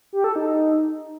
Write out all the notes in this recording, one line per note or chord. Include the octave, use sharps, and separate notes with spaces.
G4
A4
D#4